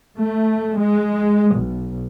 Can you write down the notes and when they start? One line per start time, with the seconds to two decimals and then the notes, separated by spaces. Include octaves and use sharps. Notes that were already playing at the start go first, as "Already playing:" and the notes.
0.18 A3
0.77 G#3
1.55 B1